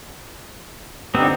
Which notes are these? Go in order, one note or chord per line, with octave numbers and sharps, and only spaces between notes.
D3 B3 C4 D#4 G4